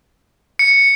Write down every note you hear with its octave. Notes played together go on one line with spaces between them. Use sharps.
C#7